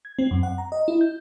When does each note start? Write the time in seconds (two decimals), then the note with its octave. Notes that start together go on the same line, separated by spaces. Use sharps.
0.05 G#6
0.19 C4
0.31 F#2
0.43 F#5
0.58 A#5
0.72 D#5
0.88 E4
1.01 G6